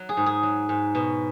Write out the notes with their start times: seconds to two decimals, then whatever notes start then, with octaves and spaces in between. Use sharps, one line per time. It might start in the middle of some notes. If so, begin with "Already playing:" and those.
Already playing: F#3
0.09 G#4
0.17 G#2
0.26 G#4
0.43 F#3
0.69 G#2
0.95 B2